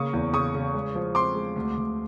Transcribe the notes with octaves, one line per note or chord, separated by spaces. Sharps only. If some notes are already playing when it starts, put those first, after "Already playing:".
Already playing: C#3 A#3 C#6 D#6
E2
C#3 C#6 D#6
C#3
G#3
F3
C4 C6 D6
G#3
D2
D2